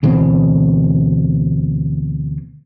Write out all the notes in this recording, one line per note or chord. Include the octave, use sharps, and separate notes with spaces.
D2 B2 E3 C4